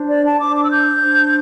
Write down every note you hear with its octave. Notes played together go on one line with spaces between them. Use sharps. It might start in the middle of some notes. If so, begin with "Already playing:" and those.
Already playing: D4 C5
D5
A5
D4 C5 D6
D6
E6
G6
D4 C5